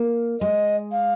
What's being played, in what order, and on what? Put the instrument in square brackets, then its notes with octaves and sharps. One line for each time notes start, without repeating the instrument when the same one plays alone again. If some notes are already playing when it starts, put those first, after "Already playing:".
Already playing: [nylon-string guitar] A#3
[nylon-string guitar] G#3 [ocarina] D#5
[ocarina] F5